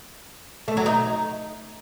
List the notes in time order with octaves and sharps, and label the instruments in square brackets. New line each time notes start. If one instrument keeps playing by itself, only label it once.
[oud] A3
F#3
D#4